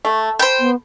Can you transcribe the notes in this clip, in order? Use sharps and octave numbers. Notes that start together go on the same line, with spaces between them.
A3
C5 G5 B5
B3